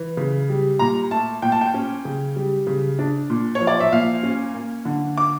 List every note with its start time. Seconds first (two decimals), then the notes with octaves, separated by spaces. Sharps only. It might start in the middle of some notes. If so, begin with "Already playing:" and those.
Already playing: E3
0.17 C#3
0.49 G3
0.79 A#2 A#5
1.11 A3 A5
1.42 A#2 G5
1.52 A5
1.61 G5
1.74 C#4
2.05 C#3
2.36 G3
2.67 C#3
2.99 D4
3.30 A#2
3.55 C#5
3.60 F3
3.67 D5
3.80 E5
3.92 A#2 F5
4.23 C#4
4.54 A#3
4.85 D3
5.18 D6